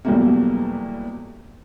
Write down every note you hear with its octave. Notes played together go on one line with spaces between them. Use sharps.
E2 B2 F#3 G3 A3 A#3